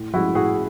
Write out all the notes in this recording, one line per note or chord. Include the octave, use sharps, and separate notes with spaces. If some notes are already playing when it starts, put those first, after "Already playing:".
Already playing: A2
F3 G#3 E4 F#4
A2 F#4 G#4